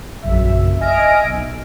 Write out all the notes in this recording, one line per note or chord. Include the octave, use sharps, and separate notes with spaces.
A#1 F#2 C#3 E5
D#5 E5 G#5 F6 A#6 D7
B1